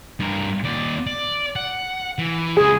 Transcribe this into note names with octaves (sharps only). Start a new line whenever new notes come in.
G2 A#4
D#2 D5
D5
F#5
E3
C#2 E4 G#4 G#5